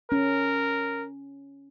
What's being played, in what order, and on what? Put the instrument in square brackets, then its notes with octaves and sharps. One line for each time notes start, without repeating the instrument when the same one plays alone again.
[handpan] C#4 [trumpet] A#4